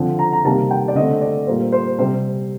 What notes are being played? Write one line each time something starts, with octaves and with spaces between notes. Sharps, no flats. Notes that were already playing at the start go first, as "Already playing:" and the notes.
Already playing: D3 F3 C4
A#5
A#5
C3 D#3 G3 A#3 A5
G5
D5
D3 A3 C4 D#5
D5
A#2 G3 A#3 C5
C5
C3 G3 C4 C5